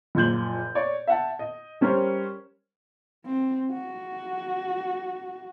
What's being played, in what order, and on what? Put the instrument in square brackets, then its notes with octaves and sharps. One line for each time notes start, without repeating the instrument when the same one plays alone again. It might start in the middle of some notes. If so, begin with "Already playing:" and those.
[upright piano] F#1 A#2 F3 G6 F#7
C#5 D5
E5 F#5 A5
D#5
G3 C#4 A#4 C5 C#5
[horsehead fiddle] C4
F#4